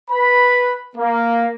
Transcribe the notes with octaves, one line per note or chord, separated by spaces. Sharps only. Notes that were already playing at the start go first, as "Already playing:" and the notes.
B4 B5
A#3